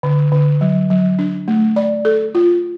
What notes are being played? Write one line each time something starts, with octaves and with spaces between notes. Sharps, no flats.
D3
D3
F#3
F#3
D4
A3
D5
A4
F4